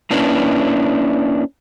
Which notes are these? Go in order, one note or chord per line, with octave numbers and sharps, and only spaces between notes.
A#3 C#4 D4 E4 B4